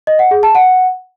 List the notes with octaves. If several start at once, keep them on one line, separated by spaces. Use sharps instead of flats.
D#5
F#5
G#4
A5
F#5